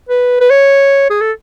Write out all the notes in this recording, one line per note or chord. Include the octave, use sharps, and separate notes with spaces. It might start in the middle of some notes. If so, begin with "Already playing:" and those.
B4
B4
C#5
G#4
A4